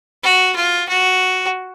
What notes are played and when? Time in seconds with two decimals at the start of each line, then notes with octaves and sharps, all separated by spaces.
0.23 F#4
0.55 F4
0.88 F#4